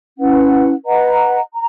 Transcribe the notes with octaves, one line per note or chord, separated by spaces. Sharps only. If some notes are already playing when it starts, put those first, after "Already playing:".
C#4 E4 B4 F#5
B4 D#5 F#5 A#5
A#5